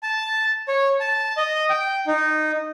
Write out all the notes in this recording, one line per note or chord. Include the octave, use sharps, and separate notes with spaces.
A5
C#5
A5
D#5
G5
D#4